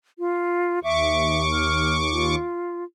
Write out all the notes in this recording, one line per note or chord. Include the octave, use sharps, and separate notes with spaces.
F4
D#2 E5 C#6 D6
F6
F4